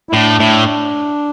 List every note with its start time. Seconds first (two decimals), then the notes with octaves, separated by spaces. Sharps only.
0.09 E4
0.13 A2 D4
0.40 A2